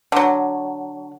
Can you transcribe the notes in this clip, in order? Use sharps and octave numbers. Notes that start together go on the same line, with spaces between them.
D3 F#3